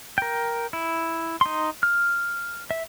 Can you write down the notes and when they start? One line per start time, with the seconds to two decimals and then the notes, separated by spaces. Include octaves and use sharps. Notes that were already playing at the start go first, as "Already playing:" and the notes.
0.18 A#4 G5
0.73 E4
1.41 D#4 C6
1.83 F6
2.71 E5